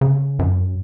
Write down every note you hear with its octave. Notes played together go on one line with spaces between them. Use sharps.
C#3
F#2